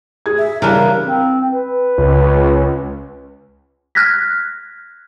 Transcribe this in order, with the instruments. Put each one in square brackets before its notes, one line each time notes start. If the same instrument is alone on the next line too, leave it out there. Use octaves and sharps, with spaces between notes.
[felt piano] G#4 G#6
[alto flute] E5
[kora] C#3 D4 [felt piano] E3 G3 [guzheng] A#3 B4 [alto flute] A#5
[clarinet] C4
B4
[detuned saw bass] C#2
[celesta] F6 F#6 G#6 A#6 B6